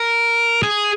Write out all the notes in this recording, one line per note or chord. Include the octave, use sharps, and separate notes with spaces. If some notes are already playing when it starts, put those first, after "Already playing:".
Already playing: A#4
G#4